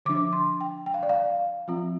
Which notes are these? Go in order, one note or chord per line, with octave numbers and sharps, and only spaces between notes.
D3 F3 D4 D6
C6
G5
G5
F5
D5
F5
F3 C4 F4